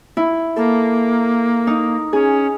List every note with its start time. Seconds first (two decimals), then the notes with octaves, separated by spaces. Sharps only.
0.17 E4
0.56 A#3 A4
1.67 D#4
2.13 C#4 G#4